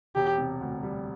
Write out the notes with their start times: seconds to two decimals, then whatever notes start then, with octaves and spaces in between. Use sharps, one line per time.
0.16 E1 G4
0.38 C3
0.61 D2
0.83 G3